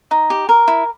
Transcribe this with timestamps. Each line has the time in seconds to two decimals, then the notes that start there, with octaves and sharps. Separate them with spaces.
0.11 D#4
0.30 G4
0.49 A#4
0.68 E4